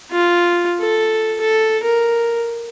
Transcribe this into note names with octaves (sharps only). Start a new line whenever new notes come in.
F4
A4
A4
A#4